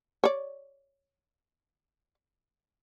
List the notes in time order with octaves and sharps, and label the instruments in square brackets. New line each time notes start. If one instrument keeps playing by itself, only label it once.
[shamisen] C#5 D5